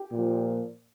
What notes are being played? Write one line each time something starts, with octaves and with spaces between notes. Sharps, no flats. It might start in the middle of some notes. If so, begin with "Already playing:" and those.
Already playing: G4
A#2 F3